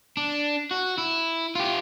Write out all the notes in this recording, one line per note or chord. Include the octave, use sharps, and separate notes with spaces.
D4
F#4
E4
F4 G4